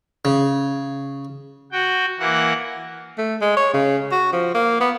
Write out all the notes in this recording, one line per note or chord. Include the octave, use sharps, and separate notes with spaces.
C#3
F#4 G5
E3 A#3 F#5
A3
G#3
C#5
C#3
F#4
F3
A#3
B3